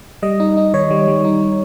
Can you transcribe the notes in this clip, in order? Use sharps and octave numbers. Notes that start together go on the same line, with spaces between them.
G3 D#5
D#4
D#4
D#3 C#5
G3
G3
D#4